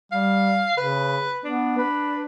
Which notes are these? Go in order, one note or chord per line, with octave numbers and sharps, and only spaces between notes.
G3 F5
C#3 B4
B3 D4
B4